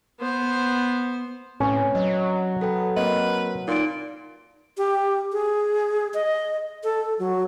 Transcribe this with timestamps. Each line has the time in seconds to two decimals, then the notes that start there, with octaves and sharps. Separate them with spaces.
0.20 B3 C5
1.60 A2 C4 C#4 B4 C#5
1.95 F#3 D#5
2.61 B3 A4 G5
2.96 A#3 C4 A#4 B4 D#5
3.68 A#2 D#4 C6 D7
4.78 G4
5.33 G#4
6.14 D#5
6.84 A4
7.19 F#3